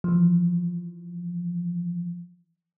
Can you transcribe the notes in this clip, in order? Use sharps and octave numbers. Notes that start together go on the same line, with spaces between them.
E3 F3